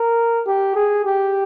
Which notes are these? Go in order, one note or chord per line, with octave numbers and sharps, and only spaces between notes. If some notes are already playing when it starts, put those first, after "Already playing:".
Already playing: A#4
G4
G#4
G4